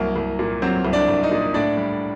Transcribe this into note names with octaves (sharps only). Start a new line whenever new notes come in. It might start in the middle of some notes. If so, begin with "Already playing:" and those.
Already playing: C2 F#3 A#3 A#4
C2
A#2
F#3 C4 C5
C2
D4 D5
C2
D#4 D#5
A#2
A2 D4 D5
G3